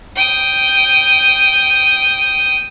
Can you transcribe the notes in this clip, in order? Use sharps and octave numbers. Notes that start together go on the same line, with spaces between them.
G5 D#6